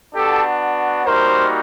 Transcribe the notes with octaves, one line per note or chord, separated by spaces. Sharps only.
B3 D4 F#4 G4 A4
G3 A#3 D#4 F#4 A#4 C5